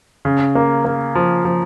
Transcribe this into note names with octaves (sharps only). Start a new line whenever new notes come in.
C#3
A#3
A#3
F3
F3